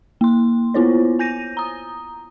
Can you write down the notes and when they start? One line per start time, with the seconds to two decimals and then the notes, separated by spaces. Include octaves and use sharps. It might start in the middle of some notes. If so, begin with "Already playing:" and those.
0.21 A#3 C6
0.74 B3 E4 F4 C5 C#5
1.19 G#5 G6 A#6 D#7
1.57 A#5 D#6